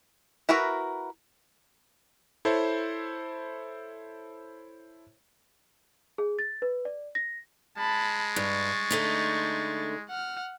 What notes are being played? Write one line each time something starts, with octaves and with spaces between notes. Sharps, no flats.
E4 F#4 A#4 B4
E4 A4 C5 C#5
G#4
A6
B4
D5
A#6
G#3 A5 B5
G2 C#6 A6
D3 A3 D#4
F#5 F6